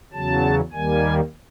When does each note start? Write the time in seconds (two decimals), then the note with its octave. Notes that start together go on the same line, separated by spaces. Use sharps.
0.13 E2 C#3 F#3 A5
0.73 D#2 D#3 G3 A#3 G#5